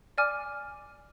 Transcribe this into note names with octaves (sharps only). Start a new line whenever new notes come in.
D5 G#5 D6 F6